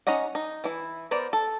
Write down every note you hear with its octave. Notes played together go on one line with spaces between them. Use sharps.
C#4 D#4 D#5 F#5
D#4
E3 E4
B3 A#4 C5 D5
A4